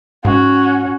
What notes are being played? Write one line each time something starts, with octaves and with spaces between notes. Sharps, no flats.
G#2 C#4 F#4